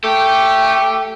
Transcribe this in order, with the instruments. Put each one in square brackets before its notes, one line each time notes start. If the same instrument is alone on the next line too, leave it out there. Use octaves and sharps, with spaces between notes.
[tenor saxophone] A3 [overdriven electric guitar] G4 [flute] G5